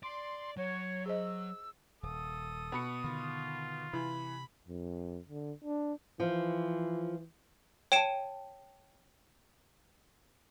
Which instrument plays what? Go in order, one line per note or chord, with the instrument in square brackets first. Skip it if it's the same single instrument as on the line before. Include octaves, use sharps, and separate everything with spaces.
[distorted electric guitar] D5 [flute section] C6
[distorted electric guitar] F#3 [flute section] C#5
[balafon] G#4 C5 D#5 [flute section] E6
[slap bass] D#1 [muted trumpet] A4 [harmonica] D#6
[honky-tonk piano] B2 B5 C#7
[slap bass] D3 D#3 [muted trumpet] F4
[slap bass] C3 [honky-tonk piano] E3 [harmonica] B5
[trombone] F2
D3
D4
[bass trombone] E3 [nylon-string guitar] F3
[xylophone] C#5 D7 E7 [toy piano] G5 A5